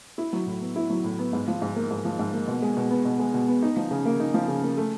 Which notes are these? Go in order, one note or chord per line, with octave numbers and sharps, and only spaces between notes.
E4
F#3
A2
B3
E4
F#3
A2
B3
G#2
F3
G#2
A#3
G#2
F3
G#2
A#3
B2
G#3
B2
B3
B2
G#3
B2
B3
D#4
F3
C#3
A#3
D#4
F3
C#3
A#3
A3